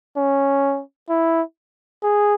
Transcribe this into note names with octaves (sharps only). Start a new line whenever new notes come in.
C#4
E4
G#4